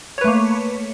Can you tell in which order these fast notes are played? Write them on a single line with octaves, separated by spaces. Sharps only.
C#5 B4 A3 A#3